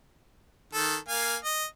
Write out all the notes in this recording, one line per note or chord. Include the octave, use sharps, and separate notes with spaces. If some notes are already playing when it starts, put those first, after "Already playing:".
D#3 A4
A#3 F5 G#5
D#5